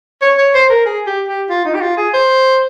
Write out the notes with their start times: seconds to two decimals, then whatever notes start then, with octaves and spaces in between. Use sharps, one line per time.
0.22 C#5
0.38 C#5
0.54 C5
0.70 A#4
0.86 G#4
1.07 G4
1.28 G4
1.50 F4
1.65 D#4
1.74 G4
1.81 F4
1.97 G#4
2.14 C5